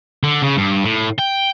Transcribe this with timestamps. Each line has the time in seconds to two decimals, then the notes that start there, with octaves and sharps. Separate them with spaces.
0.23 D3
0.42 C#3
0.57 G2
0.84 A2
1.18 G5